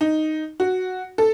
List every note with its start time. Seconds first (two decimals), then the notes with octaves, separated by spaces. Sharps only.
0.01 D#4
0.60 F#4
1.18 A4